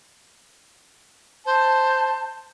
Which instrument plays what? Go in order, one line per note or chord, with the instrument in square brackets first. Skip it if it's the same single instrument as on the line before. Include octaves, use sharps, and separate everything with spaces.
[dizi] C5 [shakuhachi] A5